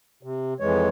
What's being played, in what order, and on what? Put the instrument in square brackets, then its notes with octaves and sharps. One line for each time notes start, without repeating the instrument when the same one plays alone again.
[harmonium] C3
F2 E3 G#3 C#5